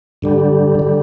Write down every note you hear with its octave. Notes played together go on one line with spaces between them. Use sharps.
G2 D3 G3
D3 G3